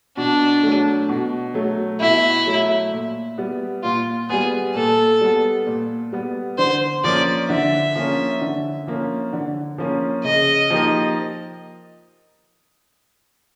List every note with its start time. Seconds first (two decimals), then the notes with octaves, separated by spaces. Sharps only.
0.17 B2 D4
0.63 F#3 A3
1.09 B2
1.54 F#3 A3
2.01 B2 E4
2.46 F#3 A3
2.92 A#2
3.38 G3 B3
3.83 A#2 F4
4.29 G3 B3 G#4
4.75 A#2 A4
5.21 G3 B3
5.67 A#2
6.13 G3 B3
6.58 D3 C5
7.04 F3 A#3 C#4 D5
7.49 D3 E5
7.95 F3 A#3 C#4
8.41 D3
8.87 F3 A#3 C#4
9.33 D3
9.78 F3 A#3 C#4
10.24 C#3 D#5
10.70 F3 A#3 D#4 G4